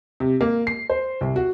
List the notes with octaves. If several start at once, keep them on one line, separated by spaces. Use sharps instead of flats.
C3
A#3
C7
C5
C2
F#4